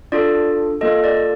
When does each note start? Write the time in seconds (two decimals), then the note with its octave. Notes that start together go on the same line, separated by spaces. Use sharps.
0.12 D4 F4 A4 D5
0.81 A#3 F4 A4 D#5
1.04 D5